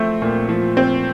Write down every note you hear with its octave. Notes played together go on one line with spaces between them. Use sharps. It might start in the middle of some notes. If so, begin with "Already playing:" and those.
Already playing: F3 A3 C4
A#2
F3
C4